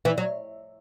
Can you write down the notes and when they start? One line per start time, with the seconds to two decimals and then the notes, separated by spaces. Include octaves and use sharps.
0.05 E3
0.18 F#3